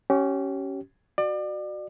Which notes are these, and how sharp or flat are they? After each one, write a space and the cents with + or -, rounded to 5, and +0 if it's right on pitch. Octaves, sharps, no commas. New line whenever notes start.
C#4 +0 G4 -35
F#4 +0 D5 +30